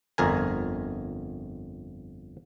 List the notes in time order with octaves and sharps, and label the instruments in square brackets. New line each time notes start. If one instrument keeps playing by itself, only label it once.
[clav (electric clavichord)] G1 F2 A#4 G#5